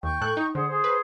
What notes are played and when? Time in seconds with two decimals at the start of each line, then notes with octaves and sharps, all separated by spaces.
0.03 D#2 G5 C#6 G6
0.21 A2 A4 F#6
0.37 D#4
0.55 D3 G#4 C5 F#5
0.69 G#4 C5
0.84 B4